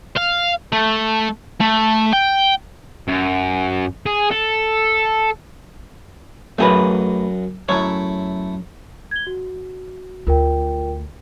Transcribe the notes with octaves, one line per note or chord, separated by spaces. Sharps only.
F5
A3
A3
G5
F#2
G#4
A4
F#2 A3 G#4 B4 D#5
F#2 A3 E4 C#5
G#6 G7
F#4
D2 F4 A#4 G5